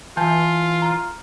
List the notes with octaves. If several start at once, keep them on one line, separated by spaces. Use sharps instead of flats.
E3 F4 G#5 A5 G6
A#5 F6